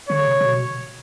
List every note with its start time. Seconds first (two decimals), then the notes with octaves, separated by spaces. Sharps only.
0.09 D3 C#5
0.27 C3
0.41 C3
0.45 B2